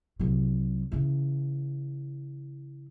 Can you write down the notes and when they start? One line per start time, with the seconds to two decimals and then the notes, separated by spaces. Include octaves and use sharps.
0.19 C2 F#3
0.92 C#3 E3